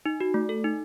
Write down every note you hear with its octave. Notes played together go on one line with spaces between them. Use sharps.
D#4
F#4
A3
A4
D#4